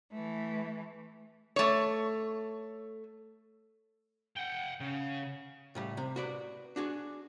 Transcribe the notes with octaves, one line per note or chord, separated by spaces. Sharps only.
E3 A3
A3 C#5
F#5 G5
C#3
A2 C#3 G3
C3
F#4 B4 D5
D4 F#4 G#4